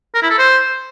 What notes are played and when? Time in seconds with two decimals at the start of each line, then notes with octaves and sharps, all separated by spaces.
0.14 A#4
0.22 E4
0.30 A4
0.38 C5